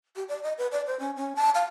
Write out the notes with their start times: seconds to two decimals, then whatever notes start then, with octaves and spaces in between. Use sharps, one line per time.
0.16 G4
0.29 D5
0.43 D#5
0.58 B4
0.72 D5
0.87 C5
1.00 C#4
1.16 C#4
1.36 A5
1.55 F5